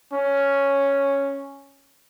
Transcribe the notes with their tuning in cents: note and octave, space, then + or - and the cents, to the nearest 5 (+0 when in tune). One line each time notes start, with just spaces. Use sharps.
C#4 +0